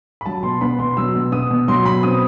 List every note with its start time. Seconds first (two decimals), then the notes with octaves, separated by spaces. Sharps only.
0.21 B5
0.26 F#3 A5
0.43 B2 C6
0.61 B3 B5
0.79 B2 C6
0.97 F#3 E6
1.14 B2
1.32 B3 D#6
1.51 B2
1.68 F#3 C6
1.85 B2 B5
2.03 C4 D#6